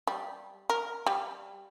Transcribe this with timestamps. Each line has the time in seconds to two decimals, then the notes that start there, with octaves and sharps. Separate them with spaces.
0.07 G3
0.70 A#4
1.06 G3